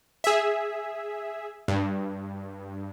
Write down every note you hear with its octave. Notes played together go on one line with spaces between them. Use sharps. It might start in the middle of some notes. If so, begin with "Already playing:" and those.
G#4 E5
G2